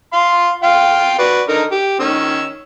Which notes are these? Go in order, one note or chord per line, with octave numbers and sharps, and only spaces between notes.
F5 C6
F4 F5 G5
F#4 B4 D5
D3 D#4 A#4
G4
D#3 C#4 E6